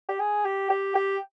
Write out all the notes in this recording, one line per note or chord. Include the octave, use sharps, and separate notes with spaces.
G4
G#4
G4
G4
G4